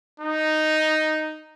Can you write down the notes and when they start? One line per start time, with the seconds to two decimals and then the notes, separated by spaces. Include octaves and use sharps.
0.20 D#4